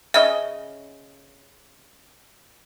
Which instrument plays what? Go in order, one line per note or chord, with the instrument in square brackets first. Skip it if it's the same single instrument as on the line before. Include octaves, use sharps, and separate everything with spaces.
[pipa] C#3 C#4 D#5 [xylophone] E5